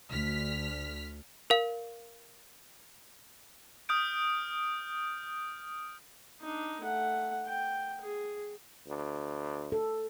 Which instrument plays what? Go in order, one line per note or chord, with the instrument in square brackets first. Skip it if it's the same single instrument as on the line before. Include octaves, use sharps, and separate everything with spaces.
[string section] D2 F6 B6
[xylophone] A#4 F5
[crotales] D#6 F6 G6 D7
[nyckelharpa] D4 D#4
A3 F#5
G5
G#4
[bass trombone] D2
[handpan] A4